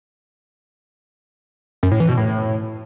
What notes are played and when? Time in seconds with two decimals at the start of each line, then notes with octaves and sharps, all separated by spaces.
1.83 F#2
1.91 A2
2.00 E3
2.09 B2
2.17 A2